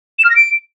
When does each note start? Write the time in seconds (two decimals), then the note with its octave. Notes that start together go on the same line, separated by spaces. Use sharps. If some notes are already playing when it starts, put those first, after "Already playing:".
0.19 E7
0.24 F6
0.30 A#6
0.36 D7